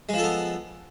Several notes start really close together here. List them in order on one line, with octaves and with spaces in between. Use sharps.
G#3 F3 A4 B3